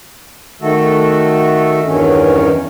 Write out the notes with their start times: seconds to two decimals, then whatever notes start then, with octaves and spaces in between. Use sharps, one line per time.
0.61 D#3 A3 F#4 A4
1.86 E2 G2 D#3 C#4